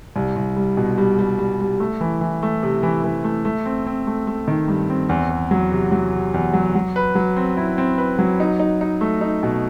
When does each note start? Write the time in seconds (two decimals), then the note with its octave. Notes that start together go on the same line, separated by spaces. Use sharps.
0.16 C2
0.36 C2
0.56 G3
0.77 B2
0.98 G3
1.19 G3
1.39 G3
1.61 G3
1.80 A3
2.01 E3
2.21 E3
2.43 A3
2.63 C3
2.83 E3
3.04 E3
3.24 A3
3.45 A3
3.65 C4
3.87 C4
4.07 A3
4.27 A3
4.48 D#3
4.68 G2
4.90 C4
5.09 E2
5.30 E2
5.51 F#3
5.72 C3
5.92 F#3
6.13 C3
6.34 E2
6.53 F#3
6.75 F#3
6.96 B4
7.15 F#3
7.37 C4
7.57 E4
7.78 C4
7.98 B4
8.19 F#3
8.40 D#4
8.60 D#4
8.81 D#4
9.01 A3
9.21 D#4
9.43 B2